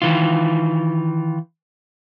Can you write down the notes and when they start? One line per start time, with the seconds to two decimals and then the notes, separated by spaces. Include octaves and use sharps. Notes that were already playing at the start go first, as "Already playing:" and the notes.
0.02 D#3 E3 F4